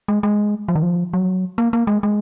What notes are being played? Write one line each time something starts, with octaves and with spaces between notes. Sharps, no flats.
G#3
G#3
F3
D#3
F3
F#3
A#3
A#3
G#3
G#3